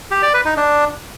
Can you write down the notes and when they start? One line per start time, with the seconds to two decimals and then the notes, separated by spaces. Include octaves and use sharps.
0.11 G4
0.22 D5
0.34 B4
0.45 D#4
0.57 D4